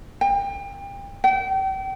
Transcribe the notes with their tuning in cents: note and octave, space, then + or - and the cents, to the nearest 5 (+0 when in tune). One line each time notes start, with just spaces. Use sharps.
G5 +30
G5 -35